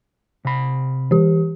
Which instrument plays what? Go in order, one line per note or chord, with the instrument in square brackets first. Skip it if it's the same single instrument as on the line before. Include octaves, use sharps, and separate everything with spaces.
[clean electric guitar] C3 B5
[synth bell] E3 G4